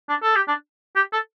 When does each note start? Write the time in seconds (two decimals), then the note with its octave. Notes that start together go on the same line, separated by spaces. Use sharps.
0.09 D4
0.23 A4
0.36 G4
0.48 D4
0.96 G4
1.13 A4